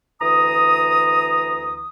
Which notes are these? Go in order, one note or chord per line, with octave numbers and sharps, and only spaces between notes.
D2 E3 A#5 D#6